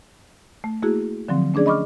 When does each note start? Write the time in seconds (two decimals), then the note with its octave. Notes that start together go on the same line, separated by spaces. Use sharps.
0.64 A3
0.82 A3 A#3 E4 F#4 G#4
1.28 D3 F3 F#3 C4
1.54 A3 C#4 D4 G#4 D5
1.66 D#5 B5 C#6 D6 F6